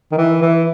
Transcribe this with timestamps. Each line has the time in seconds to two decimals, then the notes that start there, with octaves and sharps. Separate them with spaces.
0.12 D#3
0.18 E3
0.42 E3